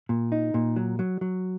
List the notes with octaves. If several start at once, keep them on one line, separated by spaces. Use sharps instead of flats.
A#2
D#4
A#2
F#3
F#3
F#3